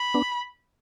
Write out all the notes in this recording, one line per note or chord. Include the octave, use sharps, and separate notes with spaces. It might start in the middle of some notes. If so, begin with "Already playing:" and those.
Already playing: B5
B3 D4